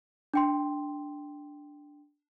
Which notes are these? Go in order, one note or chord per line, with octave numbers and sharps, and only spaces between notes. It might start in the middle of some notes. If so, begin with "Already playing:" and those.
D4 G5 C6